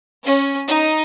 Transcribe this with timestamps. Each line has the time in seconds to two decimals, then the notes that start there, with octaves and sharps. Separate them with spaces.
0.24 C#4
0.68 D#4